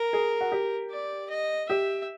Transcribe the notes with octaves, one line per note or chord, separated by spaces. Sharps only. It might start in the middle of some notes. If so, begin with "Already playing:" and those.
Already playing: A#4
G#4
F#4
G4
D5
D#5
G4 E5